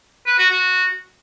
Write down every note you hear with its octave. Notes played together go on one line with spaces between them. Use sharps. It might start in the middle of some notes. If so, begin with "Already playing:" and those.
B4
F#4
F#4